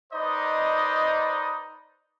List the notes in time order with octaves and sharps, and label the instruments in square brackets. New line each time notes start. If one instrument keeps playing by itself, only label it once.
[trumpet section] D#4 B4 C5 D5 D#5